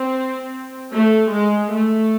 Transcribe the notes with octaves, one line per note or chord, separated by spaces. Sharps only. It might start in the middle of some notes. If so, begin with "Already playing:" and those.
Already playing: C4
A3
G#3
A3